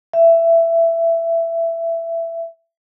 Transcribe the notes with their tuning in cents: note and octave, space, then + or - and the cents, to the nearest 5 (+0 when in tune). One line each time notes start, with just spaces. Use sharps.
E5 +15